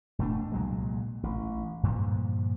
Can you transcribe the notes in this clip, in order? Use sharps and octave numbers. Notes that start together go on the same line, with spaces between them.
E1 B2 A3 D4
C2 A#2 F#3 G#3
A1
G2 A#2 D3 F3